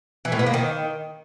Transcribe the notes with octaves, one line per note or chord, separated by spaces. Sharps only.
E3
A2
B3
A#3
D#3